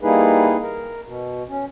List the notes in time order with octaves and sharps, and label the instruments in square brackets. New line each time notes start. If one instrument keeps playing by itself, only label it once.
[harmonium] G3 A#3 D#4 E4 G#4 B4
A#4
B2
C#4